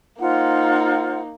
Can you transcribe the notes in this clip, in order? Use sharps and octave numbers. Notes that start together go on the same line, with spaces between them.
A#3 D#4 F4 C5 F#5